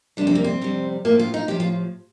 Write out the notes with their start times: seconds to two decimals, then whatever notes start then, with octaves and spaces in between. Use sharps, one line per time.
0.17 F2 C3 G3 D4
0.27 C4
0.35 A#3
0.44 C4
0.61 F2 C3 G3
1.05 A2 F3 A#3
1.19 F4
1.34 D#4
1.48 A2 F3 G4
1.60 F4